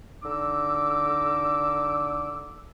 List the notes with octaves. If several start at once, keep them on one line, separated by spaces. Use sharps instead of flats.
D3 D#4 D6 E6